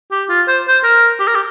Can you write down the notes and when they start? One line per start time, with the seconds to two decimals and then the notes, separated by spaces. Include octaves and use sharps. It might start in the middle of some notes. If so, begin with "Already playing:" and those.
0.11 G4
0.29 F4
0.48 C5
0.68 C5
0.84 A#4
1.20 G4
1.28 A#4
1.35 G4